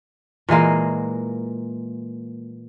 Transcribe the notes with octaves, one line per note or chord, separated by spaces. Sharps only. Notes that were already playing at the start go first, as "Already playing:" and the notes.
A#2 E3 G#3 A#3